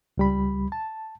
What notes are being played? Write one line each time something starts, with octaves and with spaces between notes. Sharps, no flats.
C#2 G3 B5
A5